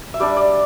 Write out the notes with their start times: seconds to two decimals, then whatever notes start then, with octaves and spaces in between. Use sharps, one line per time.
0.14 E5
0.20 G3 D4 D5
0.37 D5